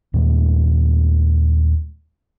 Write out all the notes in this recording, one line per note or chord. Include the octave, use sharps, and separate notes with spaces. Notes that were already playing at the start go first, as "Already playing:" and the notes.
D#2 A#2 G#3